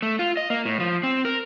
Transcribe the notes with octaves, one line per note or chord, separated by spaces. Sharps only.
A3
F4
D#5
A#3
A2
F3
C4
A#4